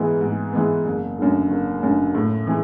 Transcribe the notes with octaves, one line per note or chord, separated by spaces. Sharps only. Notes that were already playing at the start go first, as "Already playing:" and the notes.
Already playing: G#2 E3 G#3 B3
G#2
E3 G#3 B3
F#1
F#2 D3
F#1
F#2 D3
A2
E3 G#3